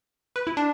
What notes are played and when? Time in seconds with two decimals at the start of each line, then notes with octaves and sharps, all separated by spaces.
0.36 B4
0.47 E4
0.57 D4